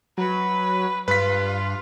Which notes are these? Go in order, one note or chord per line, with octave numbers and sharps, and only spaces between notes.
F#3 B4
G2 F4 B4 B6